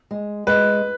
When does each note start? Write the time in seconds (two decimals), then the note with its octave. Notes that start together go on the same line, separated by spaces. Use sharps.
0.11 G#3
0.47 G#3 B4